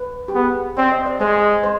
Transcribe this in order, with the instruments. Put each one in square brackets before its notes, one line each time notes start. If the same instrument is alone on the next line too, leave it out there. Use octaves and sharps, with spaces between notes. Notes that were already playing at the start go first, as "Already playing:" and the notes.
Already playing: [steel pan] B4
G4
[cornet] B3 [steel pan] G#4
[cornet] C4 [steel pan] D5
[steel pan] D#5
D5
[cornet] G#3 [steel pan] C5
[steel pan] C5